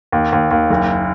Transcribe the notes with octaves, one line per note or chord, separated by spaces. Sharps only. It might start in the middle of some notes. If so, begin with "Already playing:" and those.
D#2
D#2
D#2
F#1